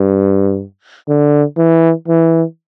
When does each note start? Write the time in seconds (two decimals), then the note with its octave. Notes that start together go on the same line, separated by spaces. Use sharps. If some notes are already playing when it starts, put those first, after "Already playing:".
Already playing: G2
1.08 D3
1.57 E3
2.08 E3